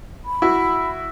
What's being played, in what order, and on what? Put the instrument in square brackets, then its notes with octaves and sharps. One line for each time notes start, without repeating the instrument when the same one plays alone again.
[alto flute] B5
[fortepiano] E4 F#4